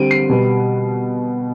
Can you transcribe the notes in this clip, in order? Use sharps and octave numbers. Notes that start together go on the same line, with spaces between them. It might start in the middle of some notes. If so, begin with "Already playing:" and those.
Already playing: D3 G3 C4 D7 D#7
C7
B2 G3 B3